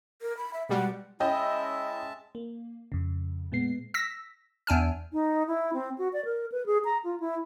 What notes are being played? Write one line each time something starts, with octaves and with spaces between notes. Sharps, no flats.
A#4
B5
E5
B2 G3 G#3 F#5
G#3 C#4 E4 D#5 E5 G5 A5
A#3
F2 C#3
A#2 G#3 B3 C7
E6 A#6 B6
E2 D4 G#5 F6
D#4
E4
C4
F#4
D5
A#4
B4
G#4
A#5
F4
E4